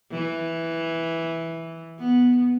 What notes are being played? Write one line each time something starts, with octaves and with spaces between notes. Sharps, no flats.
E3
B3